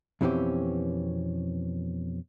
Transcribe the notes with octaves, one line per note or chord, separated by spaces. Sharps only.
F2 B2 E3 C4 C#4 G4